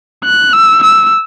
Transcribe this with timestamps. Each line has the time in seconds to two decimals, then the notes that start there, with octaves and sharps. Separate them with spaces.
0.25 F#6
0.53 E6
0.83 E6